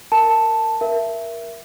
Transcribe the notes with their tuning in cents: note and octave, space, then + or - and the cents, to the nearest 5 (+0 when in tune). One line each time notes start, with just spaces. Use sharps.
A#4 -15 A5 +0
A#4 +15 E5 +15